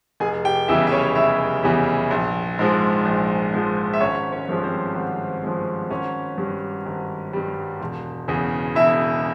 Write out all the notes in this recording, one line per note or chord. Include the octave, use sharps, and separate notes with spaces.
F1 G#4 G#5
G4 G5
E2 C#3 E3 G3 E4 E5
E5
C#4 C#5
F1 E4 E5
E2 C#3 E3 G3
A#1
G#2 F3 G#3
A#1
G#2 F3 G#3
E5
G#1 C#4 C#5
C#4 C#5
G2 F3 G#3
C4 C5
G#1
G2 F3 G#3
G#1 C#4 C#5
G2 G3
G#1
G2 G3
E1
E2 C#3
E1 E4 E5